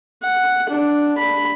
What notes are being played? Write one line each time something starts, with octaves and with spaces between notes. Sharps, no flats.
F#5
D4
B5